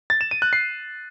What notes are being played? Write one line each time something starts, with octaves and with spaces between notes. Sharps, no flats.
A6
E7
D#7
F#6
C7